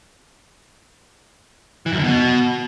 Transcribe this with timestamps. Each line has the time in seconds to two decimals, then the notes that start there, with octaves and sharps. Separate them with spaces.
1.86 E3
1.92 F#2
1.98 D3
2.04 B2